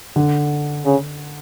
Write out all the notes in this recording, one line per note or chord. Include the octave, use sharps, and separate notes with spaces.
D3
C#3